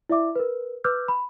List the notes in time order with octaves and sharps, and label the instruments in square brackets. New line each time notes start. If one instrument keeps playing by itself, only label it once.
[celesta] E4 D5 E5 D6
A#4 B4
B4 D6 E6 F6 G6
B5